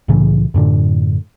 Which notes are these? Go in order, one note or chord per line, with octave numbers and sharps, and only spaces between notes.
C2 A2 C#3 E3
F#2 A2 D3